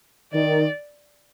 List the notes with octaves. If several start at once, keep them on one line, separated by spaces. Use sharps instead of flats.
D#3 D5